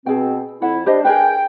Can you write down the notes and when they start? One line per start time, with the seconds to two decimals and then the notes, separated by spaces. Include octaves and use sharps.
0.06 B2 C4 G#4 G5
0.62 F2 E4 F#5
0.86 D4 G4 C5 D#5
1.05 G#4 A#4 B4 G5